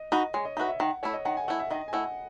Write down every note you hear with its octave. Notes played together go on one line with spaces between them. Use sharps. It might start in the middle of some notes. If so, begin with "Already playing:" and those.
Already playing: D#5
D#4 F#4 B4 D#5
G#3 C#5
D#5
D#4 F#4 B4 E5
E5
D#3 F#5
A3 E4 C#5
D#5
D#3 F#5
G#5
A3 E4 F#5
E5
D#3 D#5
G#5
A3 E4 F#5